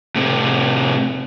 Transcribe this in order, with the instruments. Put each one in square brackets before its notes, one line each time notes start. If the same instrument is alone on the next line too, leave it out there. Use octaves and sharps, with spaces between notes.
[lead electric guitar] A2 C3